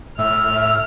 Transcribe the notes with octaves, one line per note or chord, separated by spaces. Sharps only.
A2 E5 E6 F6